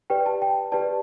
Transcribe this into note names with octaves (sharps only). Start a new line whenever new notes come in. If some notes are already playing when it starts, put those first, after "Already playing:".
G4 B4 D5 G5
A5
G5
G4 B4 D5 A5